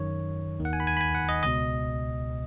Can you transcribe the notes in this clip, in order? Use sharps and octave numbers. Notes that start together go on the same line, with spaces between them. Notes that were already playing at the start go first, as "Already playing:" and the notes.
Already playing: F#2 D#3 C#5
D#2 D#3
F#5
G#5
B5
G#5
B5
G#5
F#5
D#5
C#2 B2 D#5